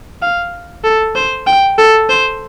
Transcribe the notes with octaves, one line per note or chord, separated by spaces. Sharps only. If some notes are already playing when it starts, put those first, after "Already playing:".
F5
A4
C5
G5
A4
C5